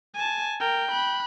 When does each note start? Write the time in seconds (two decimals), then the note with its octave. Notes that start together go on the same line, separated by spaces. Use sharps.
0.15 G#5 A5
0.60 A#4 G5
0.89 B5 F#6